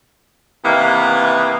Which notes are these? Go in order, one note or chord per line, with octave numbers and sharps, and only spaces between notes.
C3 D#3 E3 A#3 B3